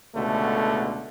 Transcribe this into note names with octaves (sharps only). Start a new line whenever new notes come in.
C#2 B2 D3 A3